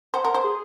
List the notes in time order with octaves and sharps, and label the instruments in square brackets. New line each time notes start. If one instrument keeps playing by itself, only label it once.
[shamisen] C5 [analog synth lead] F#5
[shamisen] A#4
C5
[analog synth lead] G#4